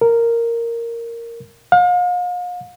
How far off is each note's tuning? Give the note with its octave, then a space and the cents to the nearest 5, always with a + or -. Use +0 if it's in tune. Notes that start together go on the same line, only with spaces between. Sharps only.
A#4 -5
F5 +40